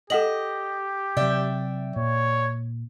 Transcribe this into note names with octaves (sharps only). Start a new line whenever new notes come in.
G4 A4 D#5 F#5 F#7
C3 F#3 D5 E5 G5
A#2 C#5